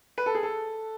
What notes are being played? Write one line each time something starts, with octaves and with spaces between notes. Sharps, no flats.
B4
A4
G#4
A4